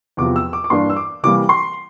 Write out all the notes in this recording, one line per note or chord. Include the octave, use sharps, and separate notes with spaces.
E2 C3 F3 D6
E6
D6
D6
G2 E3 A#3 D4 C6
E6
D6
C3 E3 G3 A#3 D6
C6